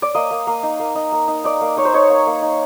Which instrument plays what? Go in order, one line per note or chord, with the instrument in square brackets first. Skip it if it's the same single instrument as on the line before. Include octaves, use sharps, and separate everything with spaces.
[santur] D5
A#3 D#5
A#3
A#3
D#4
A#3
D#4
A#3
D#4
D#4 D5
A#3
D#4 C#5
C5
D#4 C#5
A#3
A#3
D#4